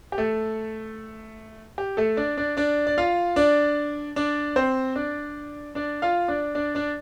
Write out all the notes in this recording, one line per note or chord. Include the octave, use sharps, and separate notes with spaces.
G4
A3 A4
G4
A3 A4
D4 D5
D4 D5
D4 D5
D5
F4 F5
D4 D5
D4 D5
C4 C5
D4 D5
D4 D5
F4 F5
D4 D5
D4 D5
D4 D5